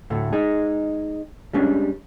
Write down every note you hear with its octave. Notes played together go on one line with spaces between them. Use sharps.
D2 A2 A3
G#3 D#4 G#4
G3 G#3 C#4 D4